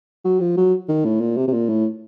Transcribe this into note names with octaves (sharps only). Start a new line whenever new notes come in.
F#3
F3
F#3
D#3
A2
A#2
C3
C3
A#2
A2